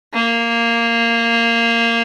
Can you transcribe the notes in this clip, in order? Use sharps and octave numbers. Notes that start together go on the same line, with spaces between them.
A#3